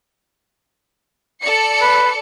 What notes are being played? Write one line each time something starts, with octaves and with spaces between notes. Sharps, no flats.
A4 D5 C#7
B4